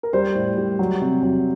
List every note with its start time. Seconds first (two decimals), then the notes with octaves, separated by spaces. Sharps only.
0.03 A#4
0.13 G3 C5
0.35 A2
0.57 G3
0.79 F#3
1.01 C3
1.23 F#3